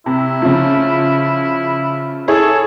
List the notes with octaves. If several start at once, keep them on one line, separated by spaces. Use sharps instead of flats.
C3 E4
C#3 F3
E4 G#4 A4 C#5